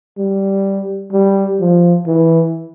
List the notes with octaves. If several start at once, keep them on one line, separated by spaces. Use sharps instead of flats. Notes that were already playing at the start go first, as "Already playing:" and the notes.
G3
G3
F3
E3